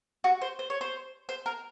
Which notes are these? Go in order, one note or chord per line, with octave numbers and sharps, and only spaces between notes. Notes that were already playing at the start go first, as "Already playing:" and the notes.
F#4
C5
C5
C#5
C5
C5
A#4